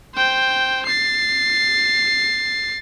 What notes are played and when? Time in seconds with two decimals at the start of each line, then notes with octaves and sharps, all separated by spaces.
0.15 C5 G5
0.86 A6 C7